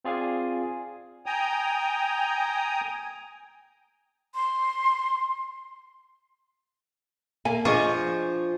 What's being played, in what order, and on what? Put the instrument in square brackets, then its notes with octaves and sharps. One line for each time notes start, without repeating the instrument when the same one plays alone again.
[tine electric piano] C4 F4 G#4 D5 F5 G#5
[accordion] G5 G#5 A#5 D#6
[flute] C6
[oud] A#3 [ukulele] G#5
[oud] F3 [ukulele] D4 D#5 [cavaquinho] G#4 C#6